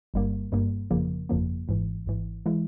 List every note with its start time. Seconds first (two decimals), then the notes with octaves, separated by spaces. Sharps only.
0.14 G1 G2 G3 A#3
0.52 G1 G2 G3 A#3
0.90 G1 F2 C#3 F3 A#3
1.29 G1 F2 C#3 F3 A#3
1.68 G#1 G#2 E3
2.06 G#1 G#2 E3
2.46 E3 G#3 E4